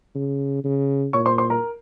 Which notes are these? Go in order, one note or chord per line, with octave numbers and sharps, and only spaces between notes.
C#3
C#3
A#2 C#5 C#6
C5 C6
C5 C6
A#4 A#5